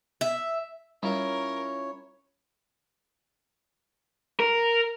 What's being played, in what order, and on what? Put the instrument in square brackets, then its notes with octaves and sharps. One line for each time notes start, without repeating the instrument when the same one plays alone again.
[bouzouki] E5
[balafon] G3 [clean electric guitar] C#4 E4 F4 [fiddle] A#4 [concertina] C#5
[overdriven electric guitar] A#4